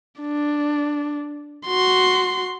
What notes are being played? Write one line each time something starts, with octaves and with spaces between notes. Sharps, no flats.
D4
F#4 C6